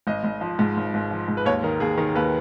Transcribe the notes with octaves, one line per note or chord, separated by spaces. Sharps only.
G#1 D#5
G#1
F3
G#2
G#1
G#1
F3
G#2
B4
D#2 C#5
D#3 A#4
D#2 G#4
D#3 A#4
D#2 B4